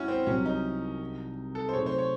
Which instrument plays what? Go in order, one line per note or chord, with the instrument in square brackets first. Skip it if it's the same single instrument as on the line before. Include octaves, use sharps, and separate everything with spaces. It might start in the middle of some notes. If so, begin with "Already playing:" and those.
Already playing: [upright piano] G#1 G#2 [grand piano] C#4 E4 F#4
[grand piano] C4
[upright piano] C2 C3 F#3 [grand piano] C#4
[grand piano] D#4
A4
C5
[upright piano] C3 F#3 A3 D#4 G#4 [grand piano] C#5
[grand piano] C5
C#5